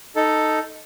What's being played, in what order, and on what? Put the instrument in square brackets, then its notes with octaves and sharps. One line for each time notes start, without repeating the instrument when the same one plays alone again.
[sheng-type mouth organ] D#4 A4